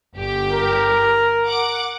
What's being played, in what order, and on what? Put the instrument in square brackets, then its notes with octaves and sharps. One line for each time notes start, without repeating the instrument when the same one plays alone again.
[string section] G1 G4
[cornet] A#4
[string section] F#5 D6